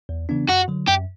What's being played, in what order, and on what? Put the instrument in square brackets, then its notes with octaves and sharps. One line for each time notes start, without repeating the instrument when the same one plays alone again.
[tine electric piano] E2
C#3 E3 B3 D4
[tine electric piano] F#2 [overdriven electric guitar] F#4
[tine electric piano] D3 F#3
[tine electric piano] F#2 [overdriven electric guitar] G4